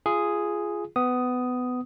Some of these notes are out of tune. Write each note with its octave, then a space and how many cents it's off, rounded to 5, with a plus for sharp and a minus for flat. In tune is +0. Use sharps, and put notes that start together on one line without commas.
F4 -20 G#4 +0
B3 +20 D#6 +0